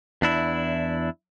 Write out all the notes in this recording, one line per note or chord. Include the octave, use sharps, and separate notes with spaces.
E2 D4 E4